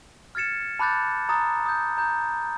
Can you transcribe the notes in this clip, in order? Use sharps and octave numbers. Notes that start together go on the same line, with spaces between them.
F6 G#6 A6 C#7 E7
A5 B5 D6 F#6 G6 A6
A#5 D#6 A6
D#6 G6
A#5 G6